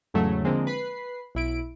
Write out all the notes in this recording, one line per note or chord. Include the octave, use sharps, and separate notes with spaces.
E2 G#2 C#3 F#3 A3
D3 F3 G#3 A#3 C4
B4 B5 C7
B1 E4 D7